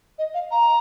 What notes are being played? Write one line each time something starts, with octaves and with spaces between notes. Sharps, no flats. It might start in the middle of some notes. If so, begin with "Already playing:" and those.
D#5
F5
A#5